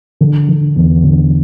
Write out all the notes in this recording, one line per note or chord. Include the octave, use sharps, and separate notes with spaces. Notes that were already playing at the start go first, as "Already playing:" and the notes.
D3
D3
E2
D3